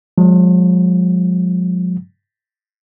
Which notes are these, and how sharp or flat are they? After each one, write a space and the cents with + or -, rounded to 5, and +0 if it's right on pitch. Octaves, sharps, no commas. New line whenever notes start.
F3 +45 G#3 -10